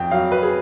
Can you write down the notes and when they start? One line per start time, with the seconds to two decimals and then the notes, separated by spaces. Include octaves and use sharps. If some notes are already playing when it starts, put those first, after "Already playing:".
Already playing: F2 G5
0.11 F#3 F5
0.32 B4
0.43 G#4